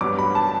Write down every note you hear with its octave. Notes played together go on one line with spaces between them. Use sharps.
A1 G2 F#3 B3 D6
B5
A5